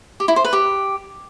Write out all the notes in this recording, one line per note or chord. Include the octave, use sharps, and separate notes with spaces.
G4
E4
C5
B4
G4